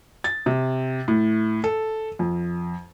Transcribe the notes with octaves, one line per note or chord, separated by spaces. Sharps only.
A6
C3
A2
A4
F2